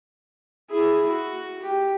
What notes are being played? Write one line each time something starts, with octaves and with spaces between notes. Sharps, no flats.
E4 G#4
F#4
G4